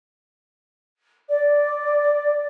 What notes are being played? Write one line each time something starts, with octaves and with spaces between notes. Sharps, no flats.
D5